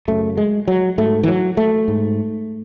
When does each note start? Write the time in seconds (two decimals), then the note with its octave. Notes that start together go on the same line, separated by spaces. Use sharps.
0.08 F#2 C#3 A3
0.37 G#3
0.68 F#3
0.98 G#2 A3
1.23 E3
1.28 F#3
1.57 A3
1.88 G#2